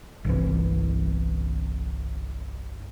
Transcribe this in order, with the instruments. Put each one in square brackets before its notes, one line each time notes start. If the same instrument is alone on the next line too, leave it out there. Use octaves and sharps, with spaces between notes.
[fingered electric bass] G1 C2 E3